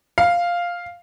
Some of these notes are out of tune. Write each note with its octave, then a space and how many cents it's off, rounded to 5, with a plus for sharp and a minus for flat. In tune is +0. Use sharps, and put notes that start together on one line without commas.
F5 +0